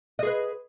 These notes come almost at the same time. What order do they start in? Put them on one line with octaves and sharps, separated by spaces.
D#5 G#4 B4